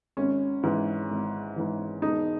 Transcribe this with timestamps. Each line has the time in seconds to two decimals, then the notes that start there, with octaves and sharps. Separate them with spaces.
0.17 G#1 C#4
0.63 G#2 E3
1.10 G#1
1.56 G#2 E3
2.02 E1 D#4